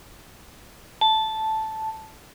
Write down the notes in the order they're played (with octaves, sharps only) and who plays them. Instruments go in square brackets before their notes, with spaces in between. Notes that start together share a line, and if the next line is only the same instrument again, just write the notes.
[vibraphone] A5